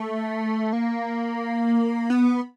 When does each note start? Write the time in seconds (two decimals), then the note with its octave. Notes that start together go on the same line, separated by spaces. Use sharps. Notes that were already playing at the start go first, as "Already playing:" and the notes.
Already playing: A3
0.73 A#3
2.10 B3